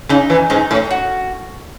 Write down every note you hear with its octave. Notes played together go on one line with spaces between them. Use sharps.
C#3 D#4
E3
G#2 D#4
A2
F#4